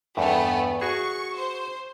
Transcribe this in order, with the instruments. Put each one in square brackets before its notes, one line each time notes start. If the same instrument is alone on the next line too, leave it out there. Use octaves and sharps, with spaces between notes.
[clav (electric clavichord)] E2 G2 [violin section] A3 B3
[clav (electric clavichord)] F#4 G#4 [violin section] C#6
[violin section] C5